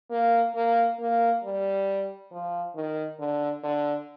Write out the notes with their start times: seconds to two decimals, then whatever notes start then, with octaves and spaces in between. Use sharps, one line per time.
0.10 A#3
0.55 A#3
1.00 A#3
1.44 G3
2.31 F3
2.75 D#3
3.20 D3
3.63 D3